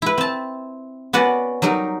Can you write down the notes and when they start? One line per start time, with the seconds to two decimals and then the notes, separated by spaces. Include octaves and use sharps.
0.02 E4 B4
0.18 C4 A5
1.13 B3 C#4 F#4 B4 D5
1.62 F#3 G3 D#4 A#4